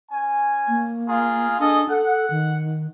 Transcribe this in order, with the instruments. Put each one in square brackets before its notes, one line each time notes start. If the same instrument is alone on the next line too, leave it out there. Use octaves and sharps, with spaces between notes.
[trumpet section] C#4 G#5
[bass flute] A#3
[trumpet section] F4 G#4 A#4
[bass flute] D4 [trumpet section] G#4 A4 D#5
[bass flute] A4 [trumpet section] F#5
[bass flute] D#3